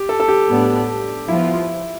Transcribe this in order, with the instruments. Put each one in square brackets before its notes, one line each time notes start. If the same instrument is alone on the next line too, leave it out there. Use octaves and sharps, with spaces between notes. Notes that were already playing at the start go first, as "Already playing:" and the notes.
Already playing: [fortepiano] G4
A4
A4
G4
[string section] A2 G3 B3 D4
[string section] F3 B3 F4 [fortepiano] E4